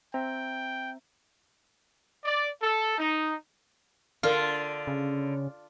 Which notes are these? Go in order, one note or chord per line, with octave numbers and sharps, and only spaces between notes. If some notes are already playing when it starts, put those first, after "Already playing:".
C4 E5 G5 A#5
D5
A4
D#4
D3 F4 A#4 F6
C#3